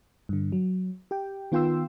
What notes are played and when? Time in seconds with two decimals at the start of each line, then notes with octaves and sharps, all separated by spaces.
0.29 G2 D3
0.52 F#3
1.11 G4 G5
1.52 D#3 B3 F4 G5 C6 E6